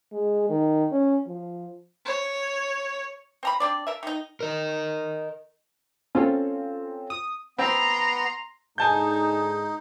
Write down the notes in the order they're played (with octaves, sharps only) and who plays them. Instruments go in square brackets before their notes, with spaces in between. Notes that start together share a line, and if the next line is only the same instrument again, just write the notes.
[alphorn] G#3
D#3
C#4
F3
[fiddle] C#5
[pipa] C4 A#5 B5
C4 D4 D5
A#4 E5
D#3 D#4
[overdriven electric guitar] A#4 D#5
[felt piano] C4 [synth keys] C#4 F4 A4
[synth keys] D#6
[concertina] B3 [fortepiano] C4 [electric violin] A#5 C6
[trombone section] G#2 D3 G#3 [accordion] D#4 [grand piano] G#5 A5 G6